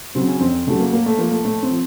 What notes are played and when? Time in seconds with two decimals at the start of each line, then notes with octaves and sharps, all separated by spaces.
0.15 C#3 F#3 C4
0.28 C#4
0.41 F2 C4
0.67 C#3 F#3 A3
0.80 A#3
0.93 A2 A#3
1.06 A3
1.18 F3 A#3
1.32 A3
1.45 A2 A3
1.62 C4
1.71 F3